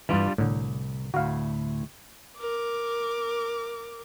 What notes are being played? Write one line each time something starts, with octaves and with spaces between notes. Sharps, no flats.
G2 E3 G3 D4 F4
C2 A2 D3
D2 A2 F#4 F5
A#4 D6